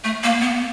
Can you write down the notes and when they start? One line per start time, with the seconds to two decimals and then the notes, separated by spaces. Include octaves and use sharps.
0.04 A3
0.23 A#3
0.41 B3